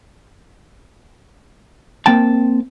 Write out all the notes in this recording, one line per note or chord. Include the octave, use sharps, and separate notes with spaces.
A#3 C4 G5 A5